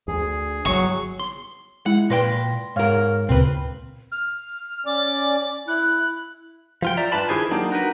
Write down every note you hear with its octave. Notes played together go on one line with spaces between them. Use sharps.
D2 G#4
G1 A2 F#3 C#6
C6
G#3 E4 F#5
A#2 B4 G5 C6 A#6
G#2 A#4 C#5 F5 F6
D2 A#2 C#3 C4 B4
F6
C#4 D5 D6
E4 F#6
F3 F4 G5
D5 E5 A#5
G2 D4 F4 B4 A5 B5
D#3 E4 G4 G#4 C5 G#5
F#3 A#3 D4 D#4 G4
D#4 F#4 A#4 B4